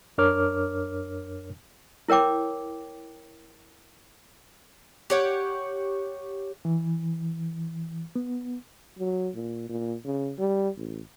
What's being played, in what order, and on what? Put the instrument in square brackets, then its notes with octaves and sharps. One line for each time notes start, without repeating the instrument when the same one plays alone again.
[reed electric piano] F#2 D4 A#4 C#5 D6 F6
[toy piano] E4 A#4 C#5 G5 D6
[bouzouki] G4 C#5 F#5
[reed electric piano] E3
B3
[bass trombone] F#3
A#2
A#2
C#3
G3
A1